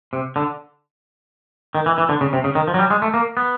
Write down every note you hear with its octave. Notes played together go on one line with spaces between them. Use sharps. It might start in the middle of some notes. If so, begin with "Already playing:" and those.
C3
D3
D#3
E3
E3
D3
C#3
C3
C#3
D#3
F3
F#3
G3
G#3
A3
A#3
B3